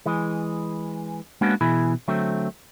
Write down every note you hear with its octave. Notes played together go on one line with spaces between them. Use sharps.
E3 G#3
G#3 A#3 B3 C#4 D4 F#4
B2 E3 E4 G#4 B5
D3 F#3 A3 C4